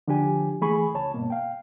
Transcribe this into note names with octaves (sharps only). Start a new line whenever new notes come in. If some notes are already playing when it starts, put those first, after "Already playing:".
D3 F3 D4 G4 G#5
E3 A3 G#4 G#5 B5 C#6
C#2 C#5 A5
G2 B2 A#3
F5 G5